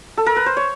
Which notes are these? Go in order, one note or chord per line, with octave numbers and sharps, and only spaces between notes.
A4
A#4
B4
C5
C#5